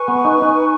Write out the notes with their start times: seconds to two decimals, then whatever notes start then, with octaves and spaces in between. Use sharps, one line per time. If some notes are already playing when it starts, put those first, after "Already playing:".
Already playing: B4 G#5 C#6
0.08 B3
0.25 D#4
0.42 D#4